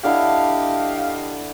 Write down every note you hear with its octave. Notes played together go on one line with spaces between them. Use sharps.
D3 E4 G4 D#5 F5 A5